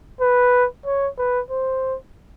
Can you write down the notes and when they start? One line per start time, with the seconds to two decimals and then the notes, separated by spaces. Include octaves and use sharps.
0.21 B4
0.86 C#5
1.18 B4
1.50 C5